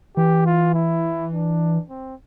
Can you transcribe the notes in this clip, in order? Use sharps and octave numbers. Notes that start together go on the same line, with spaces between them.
E3 G4
F4
E4
D4
C4